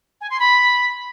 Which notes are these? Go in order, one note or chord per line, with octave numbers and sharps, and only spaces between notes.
G#5
C6
B5